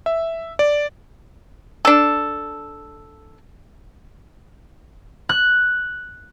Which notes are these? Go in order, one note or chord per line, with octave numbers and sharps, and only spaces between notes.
E5
D5
D4 A4
F#6